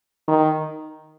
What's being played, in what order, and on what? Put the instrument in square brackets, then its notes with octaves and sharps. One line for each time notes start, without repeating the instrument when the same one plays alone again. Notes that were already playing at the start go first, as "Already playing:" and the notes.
[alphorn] D#3